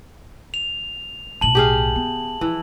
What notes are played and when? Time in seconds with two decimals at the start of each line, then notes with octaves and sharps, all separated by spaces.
0.54 F7
1.41 B1 A2 A5 F#7
1.55 G4 G#4 F5
1.96 B3
2.41 E3 F3